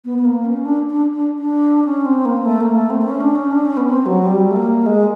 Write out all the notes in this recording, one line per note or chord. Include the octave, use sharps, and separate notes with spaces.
B3
B3
A#3
C#4
D4
D4
D4
D4
C#4
C4
A#3
A3
A#3
A3
C4
C4
C#4
D4
C#4
D4
C#4
B3
C4
F#3
G3
A3
A#3
G#3